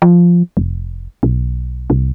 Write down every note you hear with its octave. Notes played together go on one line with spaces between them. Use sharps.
F3
F1
B1
C2